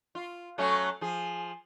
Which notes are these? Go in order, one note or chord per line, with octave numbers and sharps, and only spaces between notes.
F4
F#3 A3 C#4
F3 G#4